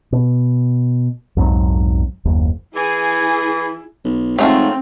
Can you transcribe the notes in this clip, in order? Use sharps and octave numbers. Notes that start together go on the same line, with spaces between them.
B2
B1 F2 G#2 F#3
F#1 D#2
E3 E4 G#4
B1
G#2 F#3 A3 C4 F4